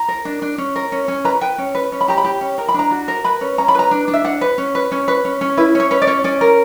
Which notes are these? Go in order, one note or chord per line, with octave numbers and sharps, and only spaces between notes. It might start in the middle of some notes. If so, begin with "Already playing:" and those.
Already playing: A#5
A#4
D4
D4
C#4
A#4
C#4
C#4
B4 A#5
B4 G5
C#4
B4
C#4
B5
G4 A#5
B5
G4
C#4
A#4 A#5
B5
D4 A#5
F#4
A#4
B4 B5
C#4
C#4 A#5
B5
B4 A#5
D4
D4
E5
D4 F#5
B4
C#4
B4
C#4
B4
C#4
C#4
E4 B4
C#4 C#5
C#4 B4
D5
C#4 C#5
C#4 D5
A#4